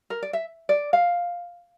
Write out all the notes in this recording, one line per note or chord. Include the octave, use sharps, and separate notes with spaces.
A#4
D5
E5
D5
F5